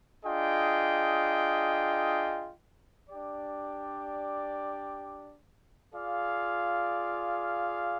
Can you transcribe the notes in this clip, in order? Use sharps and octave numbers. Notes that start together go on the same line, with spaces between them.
D4 F4 G#4 D#5 G5
D4 G4 D5
F4 G#4 D5 F5